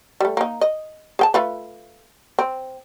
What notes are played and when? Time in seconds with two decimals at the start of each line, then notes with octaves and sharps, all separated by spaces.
0.21 G3 A3
0.37 A#3 D#4
0.61 D#5
1.19 G#4 G5 A5
1.34 A3 F4 B4
2.39 C4